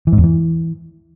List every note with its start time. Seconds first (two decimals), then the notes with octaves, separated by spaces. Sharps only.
0.07 E3
0.12 G#2
0.18 E2
0.23 E3